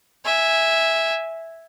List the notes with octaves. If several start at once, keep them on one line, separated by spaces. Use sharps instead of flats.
E5 G#5